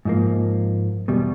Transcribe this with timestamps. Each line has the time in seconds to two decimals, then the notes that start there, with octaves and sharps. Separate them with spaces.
0.05 G#2 F3 A#3
1.08 E2 B2 G3